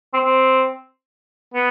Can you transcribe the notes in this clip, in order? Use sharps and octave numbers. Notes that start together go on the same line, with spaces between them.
C4
C4
B3